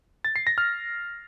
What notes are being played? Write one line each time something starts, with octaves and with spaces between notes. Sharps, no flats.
A6
C7
A#6
F6